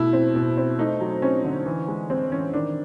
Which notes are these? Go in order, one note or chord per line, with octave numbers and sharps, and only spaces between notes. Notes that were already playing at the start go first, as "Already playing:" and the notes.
Already playing: B2 A3 E4
C4
B2
C4
A3 D#4
F#3
C4 C#4
D3
E3
G#3
G#3 C4
E3 C#4
D#3 D4